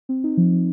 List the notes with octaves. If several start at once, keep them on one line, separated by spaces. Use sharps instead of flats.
C4
D#4
F3
F3